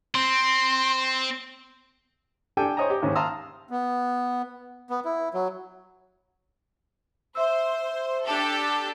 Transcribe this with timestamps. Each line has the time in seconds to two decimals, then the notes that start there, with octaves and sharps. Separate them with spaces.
0.15 C4 C6
2.57 D4 G4 A4 G5 G#5
2.77 C5 C#5 D#5 G#5 A#5
2.90 G4
3.02 D#2 G#2 C#4
3.15 F5 A5 A#5 C6 D#6 E6
3.71 B3
4.90 B3
5.05 E4
5.34 F#3
7.35 C5 E5 E6
8.25 D4 G4 A4